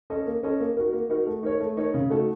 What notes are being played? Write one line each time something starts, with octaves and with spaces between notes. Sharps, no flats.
C#4 A4 D#5
A#3
C#4 A4 D#5
A#3
D#4 F#4 A#4
A#3
D#4 F#4 A#4
A3
D#4 A#4 C#5
A3
D#4 A#4 C#5
C#3
A3 D#4 F#4 A4